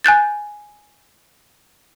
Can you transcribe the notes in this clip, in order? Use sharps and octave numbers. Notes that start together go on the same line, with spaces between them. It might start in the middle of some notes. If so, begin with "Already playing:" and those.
G#5 F#6 G6 A6